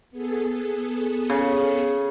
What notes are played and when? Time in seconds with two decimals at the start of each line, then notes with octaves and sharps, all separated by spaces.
0.11 B3 G#4 A4
1.30 C#3